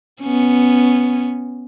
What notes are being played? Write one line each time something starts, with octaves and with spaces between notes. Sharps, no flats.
B3 C#4